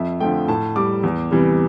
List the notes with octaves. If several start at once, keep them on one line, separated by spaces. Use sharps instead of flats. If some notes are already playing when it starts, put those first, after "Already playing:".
Already playing: F2 E5
D3 F3 A3 G5
A2 A5
G3 D6
E2
C3 E3 G3